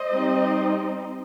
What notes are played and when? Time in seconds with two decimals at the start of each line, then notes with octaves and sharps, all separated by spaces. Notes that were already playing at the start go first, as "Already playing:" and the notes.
Already playing: C5 D#5
0.13 G3 C4 D#4